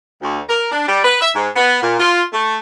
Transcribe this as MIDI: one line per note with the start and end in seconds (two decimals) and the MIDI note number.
0.23 0.39 38
0.49 0.68 70
0.72 0.86 62
0.88 0.99 55
1.04 1.17 71
1.21 1.30 76
1.35 1.48 44
1.56 1.79 59
1.83 1.96 46
2.00 2.23 65
2.33 2.58 57